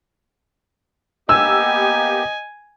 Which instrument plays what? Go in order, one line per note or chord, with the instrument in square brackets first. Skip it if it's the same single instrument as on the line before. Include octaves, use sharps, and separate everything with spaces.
[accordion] A#3 B3 G4 [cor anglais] D#5 [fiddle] G#5 [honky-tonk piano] E6